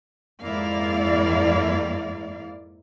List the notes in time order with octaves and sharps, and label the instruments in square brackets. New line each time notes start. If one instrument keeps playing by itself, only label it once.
[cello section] F2 G#2 A#3 E4 D5 F5